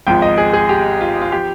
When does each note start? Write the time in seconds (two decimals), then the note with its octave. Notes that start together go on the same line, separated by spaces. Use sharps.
0.07 G#1 G#2 F3 G5
0.22 D#5
0.38 G#4
0.53 G#4
0.69 G4
1.01 F4
1.22 F4
1.32 F3 G4